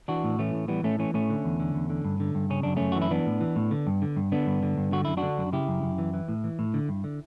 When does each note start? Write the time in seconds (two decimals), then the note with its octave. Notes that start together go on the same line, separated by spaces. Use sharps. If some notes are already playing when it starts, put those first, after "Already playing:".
0.08 E3 D4 F#4
0.24 A2
0.39 E3 A3 C#4
0.54 A2
0.68 E3 G3 B3
0.83 A2 A3 C#4
0.99 E3 A3 C#4
1.14 A2 A3 C#4
1.30 D3
1.44 E2
1.60 D3
1.75 E2
1.90 D3
2.05 G2
2.20 D3
2.35 G2
2.50 C#3 C#4
2.63 F#2 D4
2.76 F#2 A3 C#4
2.92 E3 F#4
3.02 E4
3.11 E3 B3 D4
3.26 A2
3.41 E3
3.56 A2
3.71 D3
3.87 G2
4.02 D3
4.16 G2
4.32 D3 B3 D4
4.47 G2
4.63 D3
4.78 G2
4.92 D3 F#4
5.05 F#2 E4
5.17 D4 F#4
5.23 D3
5.38 F#2
5.53 C#3 E4 G4
5.68 F#2
5.83 F#2
5.98 E3
6.14 E3
6.28 A2
6.44 E3
6.59 A2
6.74 D3
6.89 G2
7.04 D3